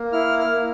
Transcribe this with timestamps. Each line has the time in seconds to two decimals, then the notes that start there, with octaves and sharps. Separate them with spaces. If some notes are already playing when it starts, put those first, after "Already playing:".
Already playing: A#3
0.12 E4 F6
0.39 F6
0.51 A#3